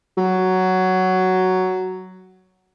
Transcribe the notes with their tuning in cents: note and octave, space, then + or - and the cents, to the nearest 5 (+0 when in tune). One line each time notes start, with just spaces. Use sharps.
F#3 +5